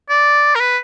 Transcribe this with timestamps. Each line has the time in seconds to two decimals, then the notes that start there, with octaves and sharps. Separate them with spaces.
0.09 D5
0.55 A#4
0.60 B4